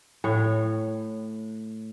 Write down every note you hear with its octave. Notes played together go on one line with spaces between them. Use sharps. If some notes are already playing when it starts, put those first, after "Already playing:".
A2 C#5